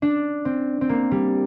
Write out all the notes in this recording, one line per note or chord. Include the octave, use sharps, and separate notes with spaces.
D4
C4
C4
A#3
G3